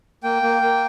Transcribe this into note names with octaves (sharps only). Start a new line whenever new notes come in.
A#3 G5
A#3
A#3